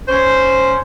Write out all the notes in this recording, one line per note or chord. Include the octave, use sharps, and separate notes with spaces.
C#4 C5